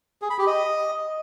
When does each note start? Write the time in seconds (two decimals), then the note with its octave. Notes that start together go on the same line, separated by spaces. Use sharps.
0.22 G#4
0.30 B5
0.39 G4
0.47 D#5